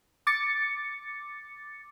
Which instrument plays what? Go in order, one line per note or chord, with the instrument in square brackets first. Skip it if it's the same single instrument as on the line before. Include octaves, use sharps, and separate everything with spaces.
[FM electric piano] D6 A6 C#7